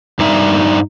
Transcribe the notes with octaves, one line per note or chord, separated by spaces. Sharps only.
G2 G3 D#4 E5